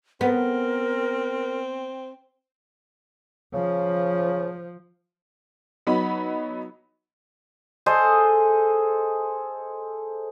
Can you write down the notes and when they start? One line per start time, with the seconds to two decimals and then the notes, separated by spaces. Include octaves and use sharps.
0.21 B3 C4 A#4
3.54 C#3 F3
5.87 F#3 B3 D#4 B5
7.86 G#4 A4 C5 D#5